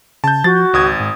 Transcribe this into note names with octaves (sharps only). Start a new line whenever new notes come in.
C#3 A5 G6
F3 F#4 A6
G#1 C#2 D#6 G#6
G#2